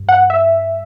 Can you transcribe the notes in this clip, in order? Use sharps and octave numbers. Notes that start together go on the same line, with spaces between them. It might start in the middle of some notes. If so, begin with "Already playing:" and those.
Already playing: G2
F#5
E5